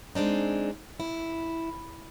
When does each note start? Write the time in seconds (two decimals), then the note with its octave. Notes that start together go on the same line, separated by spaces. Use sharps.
0.15 G#3 C4 D4 D#4
1.00 E4